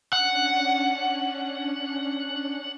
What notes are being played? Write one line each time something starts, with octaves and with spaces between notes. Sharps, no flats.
C#4 D4 F#5